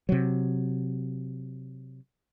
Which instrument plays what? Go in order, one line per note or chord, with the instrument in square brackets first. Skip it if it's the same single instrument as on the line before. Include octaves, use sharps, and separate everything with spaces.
[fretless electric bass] C3 F#3